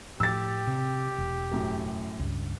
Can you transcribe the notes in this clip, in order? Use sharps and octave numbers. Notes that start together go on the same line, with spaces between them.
A2 F3 G4 E6 A6
C3
E1
F#2 A2
C#2 G2